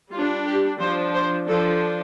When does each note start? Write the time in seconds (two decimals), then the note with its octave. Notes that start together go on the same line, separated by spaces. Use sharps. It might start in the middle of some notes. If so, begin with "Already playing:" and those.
0.11 G3 D4 F4
0.46 G4
0.80 F3 D4 C5
1.14 C5
1.48 F3 D4 A4